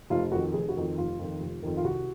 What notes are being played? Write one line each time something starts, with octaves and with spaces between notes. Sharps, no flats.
F1 F4
F2 D#3 F#4
F1 G#4
F#4
F2 D#3
F1 F4
F2 D#3
F1
F2 D#3
F4
C2 F#4